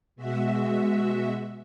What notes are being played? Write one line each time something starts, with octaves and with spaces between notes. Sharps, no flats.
B2 G#3 F#4 E5